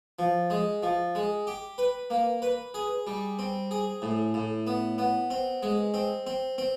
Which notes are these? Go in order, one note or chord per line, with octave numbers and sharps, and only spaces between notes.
F3
G#3
F3
G#3
G4
B4
A#3
B4
G#4
G3
C4
G#4
A2
A2
B3
B3
C4
G#3
C4
C4
C4